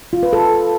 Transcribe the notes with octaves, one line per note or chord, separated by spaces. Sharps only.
F4
B4
A4